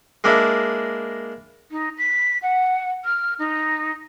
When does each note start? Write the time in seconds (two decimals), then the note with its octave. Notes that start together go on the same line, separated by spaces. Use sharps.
0.24 G#3 A#3 D4 E4
1.71 D#4
1.98 B6
2.42 F#5
3.05 F6
3.39 D#4